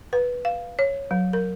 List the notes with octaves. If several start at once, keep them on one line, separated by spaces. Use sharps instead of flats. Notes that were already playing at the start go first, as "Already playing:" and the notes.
B4
F5
C#5
F#3
A#4